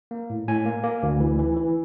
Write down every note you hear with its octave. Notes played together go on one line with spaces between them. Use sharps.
A#3
A2
A2 G#5
A#3
A#3
D2
E3
E3
E3